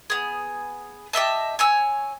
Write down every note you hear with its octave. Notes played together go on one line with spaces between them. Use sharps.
B3 G#4
G4 D#5 E5 A5
C#5 G#5 E6